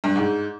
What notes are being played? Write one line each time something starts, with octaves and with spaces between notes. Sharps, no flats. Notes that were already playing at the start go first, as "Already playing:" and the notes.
G2
G#2